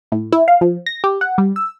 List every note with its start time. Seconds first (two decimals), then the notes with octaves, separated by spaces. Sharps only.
0.12 A2
0.32 E4
0.48 F5
0.61 F3
0.86 A#6
1.04 G4
1.21 F#5
1.38 G3
1.56 E6